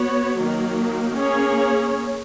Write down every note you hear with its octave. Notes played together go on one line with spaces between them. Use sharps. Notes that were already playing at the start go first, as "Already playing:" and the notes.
Already playing: B3 F#4 C#5
D#3 F#3 A#3
A#3 C#4 G#4 C#5